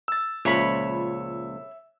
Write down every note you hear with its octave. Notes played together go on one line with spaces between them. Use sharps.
E6 A6
C#2 A#2 F3 C#5 E5 B5